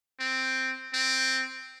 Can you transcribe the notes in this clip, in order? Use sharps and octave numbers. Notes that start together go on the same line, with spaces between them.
C4
C4